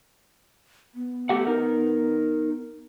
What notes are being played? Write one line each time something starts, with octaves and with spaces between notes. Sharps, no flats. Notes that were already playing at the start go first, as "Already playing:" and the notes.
B3
A3 G4 F#5
D#4 A#4